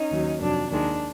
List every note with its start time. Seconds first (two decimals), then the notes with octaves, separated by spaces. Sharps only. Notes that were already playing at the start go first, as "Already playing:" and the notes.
Already playing: C#4 D#4
0.11 D#2 D#3 F#3
0.41 F2 C3 D#3 F#3 D4
0.71 D#2 D#3 G#3 D4